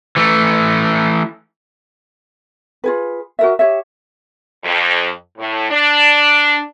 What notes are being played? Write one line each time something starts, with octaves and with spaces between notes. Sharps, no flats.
E3 A3
F4 G#4 B4
F#4 A#4 E5
G4 C#5 E5
F2
A2
D4